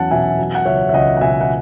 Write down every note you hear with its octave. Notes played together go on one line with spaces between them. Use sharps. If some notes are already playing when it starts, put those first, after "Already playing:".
Already playing: E2 F#3 C#4 F#5 A5
B2 E5 G#5
F#3
F#5
C#2 C#5 E5
E5
C#2 D#5 F#5
F#5
B2 E5 G#5
F#5